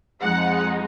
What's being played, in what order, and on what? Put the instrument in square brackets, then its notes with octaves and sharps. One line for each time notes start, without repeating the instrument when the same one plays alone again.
[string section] F2 F3 G#3 D#4 F#5